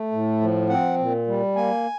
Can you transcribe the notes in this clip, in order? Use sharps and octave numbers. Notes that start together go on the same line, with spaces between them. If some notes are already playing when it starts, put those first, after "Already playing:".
Already playing: A3
A2
F3
C4 F#5
A#2
G3
A#3 G#5